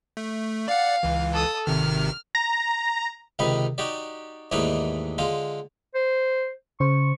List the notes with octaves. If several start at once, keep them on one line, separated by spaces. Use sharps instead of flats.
A3
D5 F5 F#5
C#2 E3
A4 D#6
G#1 C3 D#3 F6
A#5
C#2 C3 D#3 D#4 B5
D#4 F#4 G4 D5
D#2 G#2 E3 A3 D4 D#4
D3 G#3 F4
C5
C#3 C5 C#6